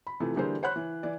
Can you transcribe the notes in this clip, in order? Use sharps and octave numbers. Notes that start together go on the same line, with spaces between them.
B5
C3 E3 F3 A3
D3 E3 G3 A#3 G#4 C5
C5 C#5 F#5 B5 F#6
E3
E3 D5